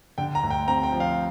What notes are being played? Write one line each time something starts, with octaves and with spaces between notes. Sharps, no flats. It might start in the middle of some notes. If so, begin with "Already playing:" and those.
D3 G5
A#5
D2
G5
C4 A#5
G5
F3
F5